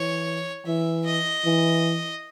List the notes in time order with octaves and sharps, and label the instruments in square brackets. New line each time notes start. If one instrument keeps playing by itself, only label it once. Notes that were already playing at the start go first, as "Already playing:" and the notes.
Already playing: [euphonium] E3 [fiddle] C#5
[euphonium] E3 [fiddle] E5
[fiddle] D#5
[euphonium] E3